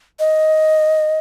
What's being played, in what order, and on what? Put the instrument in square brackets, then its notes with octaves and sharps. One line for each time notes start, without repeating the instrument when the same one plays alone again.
[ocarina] D#5